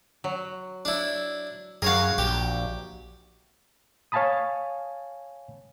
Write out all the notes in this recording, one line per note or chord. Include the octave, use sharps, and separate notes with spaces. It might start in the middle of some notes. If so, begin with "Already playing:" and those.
F#3
D4 E4
F#2 F#4 G#4 A#4 C#5 F5
A#1 G4
C#5 F5 G#5 A5 B5 D#6